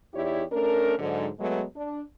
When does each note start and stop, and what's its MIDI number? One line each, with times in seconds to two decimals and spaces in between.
0.14 0.44 40
0.14 0.44 63
0.14 0.44 64
0.14 0.44 67
0.14 0.44 73
0.14 0.44 74
0.52 0.94 57
0.52 0.94 61
0.52 0.94 62
0.52 0.94 70
0.99 1.28 44
0.99 1.28 50
0.99 1.28 54
1.40 1.63 54
1.40 1.63 56
1.40 1.63 57
1.40 1.63 59
1.76 2.02 62